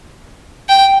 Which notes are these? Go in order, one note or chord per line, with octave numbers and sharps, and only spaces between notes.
G5